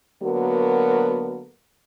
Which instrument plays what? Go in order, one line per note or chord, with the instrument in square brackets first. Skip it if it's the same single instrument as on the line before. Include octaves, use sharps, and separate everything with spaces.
[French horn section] D3 F#3 A#3 B3 F#4 A#4